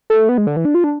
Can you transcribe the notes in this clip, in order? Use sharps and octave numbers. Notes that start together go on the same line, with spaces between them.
A3
B3
G#3
D3
E3
D4
F4
D4